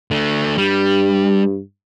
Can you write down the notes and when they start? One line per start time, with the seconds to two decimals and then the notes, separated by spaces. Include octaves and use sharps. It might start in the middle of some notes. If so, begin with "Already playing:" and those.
0.11 D3 A3
0.58 G2 G3